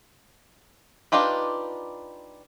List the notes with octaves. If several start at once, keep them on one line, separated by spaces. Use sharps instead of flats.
D4 D#4 F4 G4 B4